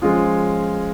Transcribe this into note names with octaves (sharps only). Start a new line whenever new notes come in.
F3 G#3 C#4 F4 G#4